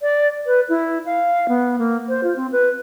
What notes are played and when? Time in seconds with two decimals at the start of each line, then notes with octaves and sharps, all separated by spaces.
0.01 D5
0.46 B4
0.69 E4
1.06 F5
1.49 B3
1.79 A#3
2.08 C5
2.23 F4
2.36 C4
2.52 B4